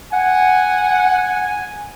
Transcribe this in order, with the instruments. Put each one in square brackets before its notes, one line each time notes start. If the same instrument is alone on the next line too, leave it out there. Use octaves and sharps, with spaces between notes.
[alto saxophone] F#5 [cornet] G#5